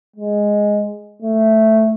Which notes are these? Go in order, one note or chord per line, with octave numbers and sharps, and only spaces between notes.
G#3
A3